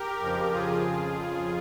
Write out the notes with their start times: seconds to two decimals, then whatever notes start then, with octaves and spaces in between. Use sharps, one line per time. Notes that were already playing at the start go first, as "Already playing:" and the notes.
Already playing: G4 A#4
0.21 F2 C#3 F3
0.53 F2 C#3 F3 F4 G#4